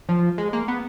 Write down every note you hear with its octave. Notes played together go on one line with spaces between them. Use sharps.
F3
G#3
A#3
B3